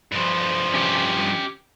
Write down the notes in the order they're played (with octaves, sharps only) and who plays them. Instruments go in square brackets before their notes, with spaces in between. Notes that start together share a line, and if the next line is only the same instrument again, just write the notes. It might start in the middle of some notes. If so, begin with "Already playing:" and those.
[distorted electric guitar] G2 F3
[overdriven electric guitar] C#4 G4